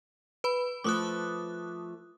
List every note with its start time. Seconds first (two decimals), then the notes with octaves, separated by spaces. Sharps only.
0.44 B4 B5
0.84 F3 A3 B4 D6 D#6 F#6